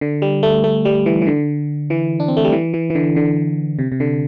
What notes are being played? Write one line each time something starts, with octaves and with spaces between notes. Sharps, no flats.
D3
G3
A3
A3
G3
E3
E3
D3
E3
D4
C4
A3
G3
E3
E3
E3
D3
D3
C3
C3
D3